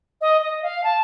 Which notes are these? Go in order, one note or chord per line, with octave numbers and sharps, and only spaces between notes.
D#5
D#5
F5
A5